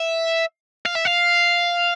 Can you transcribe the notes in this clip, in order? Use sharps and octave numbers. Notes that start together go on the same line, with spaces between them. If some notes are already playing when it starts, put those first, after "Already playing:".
Already playing: E5
F5
E5
F5